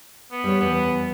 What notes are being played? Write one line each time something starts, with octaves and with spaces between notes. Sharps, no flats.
B3
G3 C#5
E2 B3